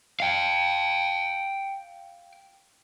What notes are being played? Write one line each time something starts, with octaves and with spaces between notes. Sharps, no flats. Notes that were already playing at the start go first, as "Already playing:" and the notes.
F5 G5